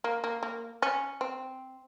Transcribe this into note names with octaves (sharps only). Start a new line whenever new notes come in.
A#3
A#3
A#3
C#4
C4